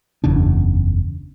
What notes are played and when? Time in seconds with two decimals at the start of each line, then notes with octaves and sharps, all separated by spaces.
0.24 F#1 E2 C#3 D4